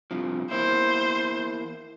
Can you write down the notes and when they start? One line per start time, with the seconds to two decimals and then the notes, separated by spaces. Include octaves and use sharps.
0.11 G2 C3 F3
0.51 E2 A#3 E4 C5